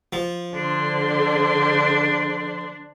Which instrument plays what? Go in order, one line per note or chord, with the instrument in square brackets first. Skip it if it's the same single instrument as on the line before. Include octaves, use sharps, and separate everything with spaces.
[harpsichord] F3
[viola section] D3 C5 C6 [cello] D4